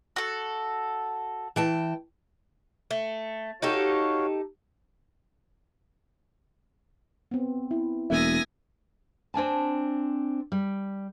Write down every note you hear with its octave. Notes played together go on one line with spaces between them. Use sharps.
F#4 A4
E3 G5 A5
A3
D#4 F#4 G4 A4 C#5 F5
B3 C4
E4
E1 A#3 A#4 E5 G#5 D#6 A#6
C4 D4 G#5 A5
G3